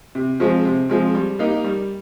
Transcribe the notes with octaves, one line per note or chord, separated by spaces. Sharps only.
C3
F3 G#3 C4
C3
F3 G#3 C4
G3
A#3 D#4 G4
G3